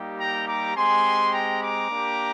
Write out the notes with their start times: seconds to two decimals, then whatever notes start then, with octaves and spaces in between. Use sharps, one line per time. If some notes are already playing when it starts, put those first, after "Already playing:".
Already playing: G3 A#3 D#4 G4
0.19 G5 A#5
0.46 A#5 D6
0.75 G#3 C4 G4 G#5 C6
1.33 G5 A#5
1.61 A#5 D6
1.89 A#3 D4 G4